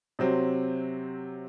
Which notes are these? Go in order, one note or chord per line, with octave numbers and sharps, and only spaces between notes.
C3 F#3 C4